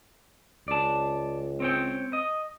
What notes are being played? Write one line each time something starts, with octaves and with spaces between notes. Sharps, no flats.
C#2 D5 A5
C4 C#5 G5
D#5